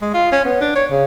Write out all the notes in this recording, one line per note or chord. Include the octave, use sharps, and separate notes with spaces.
G#3
F4
C#4
B3
D4
C#5
C#3